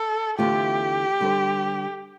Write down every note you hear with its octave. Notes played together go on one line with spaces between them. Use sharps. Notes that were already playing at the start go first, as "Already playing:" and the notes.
Already playing: A4
E2 D3 A3 C4 F4 G4
D3 G3 D4 A4 C5